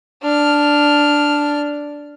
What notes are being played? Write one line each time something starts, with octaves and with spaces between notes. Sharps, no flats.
D4 F6